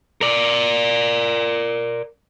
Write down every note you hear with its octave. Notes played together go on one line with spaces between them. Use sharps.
A#4 D5